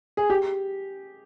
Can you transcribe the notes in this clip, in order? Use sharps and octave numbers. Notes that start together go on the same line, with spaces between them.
G#4
G4